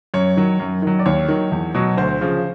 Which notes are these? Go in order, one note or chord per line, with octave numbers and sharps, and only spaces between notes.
F#2 C#5
D#3 F#3
F#2
D#3 F#3
D5
D#2 C#5
D#3 F#3
E2
B2 F#3
D2 C5
C#3 F3